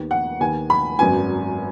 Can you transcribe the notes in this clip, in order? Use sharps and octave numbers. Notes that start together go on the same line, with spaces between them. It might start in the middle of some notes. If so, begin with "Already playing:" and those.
Already playing: D#2 D#3 B3
F#5
D#2 D#3 B3 G#5
B5
G#1 F#2 F#3 B3 G#5